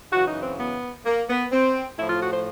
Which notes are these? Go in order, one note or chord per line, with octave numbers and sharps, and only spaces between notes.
F#2 C#3 E3 F#4
D#4
C4
B3
A#3
B3
C4
A2 F3 E4
F4
F#4
C5